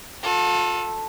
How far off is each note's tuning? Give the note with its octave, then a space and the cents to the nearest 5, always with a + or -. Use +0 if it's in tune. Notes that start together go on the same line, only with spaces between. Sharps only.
F4 +45 A4 +0